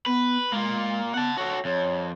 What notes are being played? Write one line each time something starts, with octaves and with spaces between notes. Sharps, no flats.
B3 B4
G#3 A#3 F4
B3 F#5 A5
F#4 A4 C#5
F2 C#5